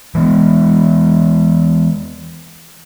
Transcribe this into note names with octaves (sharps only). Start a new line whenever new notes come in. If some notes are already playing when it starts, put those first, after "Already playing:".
E3 G#3 B3